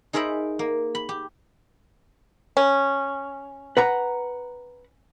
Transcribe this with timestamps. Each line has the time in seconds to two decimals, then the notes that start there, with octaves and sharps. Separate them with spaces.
0.13 D#4 G#4 A#4 C5 E5 B5
0.59 A#3
0.95 B5
1.09 G4
2.57 C#4
3.77 B4 F#5 A#5